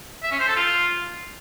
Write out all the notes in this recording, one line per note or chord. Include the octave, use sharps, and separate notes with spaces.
E5
C#4
C5
A4
F4